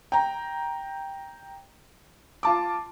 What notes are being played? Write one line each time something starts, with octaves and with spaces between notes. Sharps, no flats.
G5 A#5
F4 A5 D6